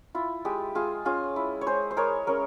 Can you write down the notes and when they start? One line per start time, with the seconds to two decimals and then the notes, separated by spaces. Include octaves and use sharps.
0.15 E4 F4
0.45 G#3 G4
0.75 G#3 F4 G#4
1.05 C#4 F4 G#4
1.36 E4
1.61 C#5
1.66 G#3 G#4 C5
1.91 C5
1.97 G#3 A#4 C#5
2.27 C#4 A#4 C#5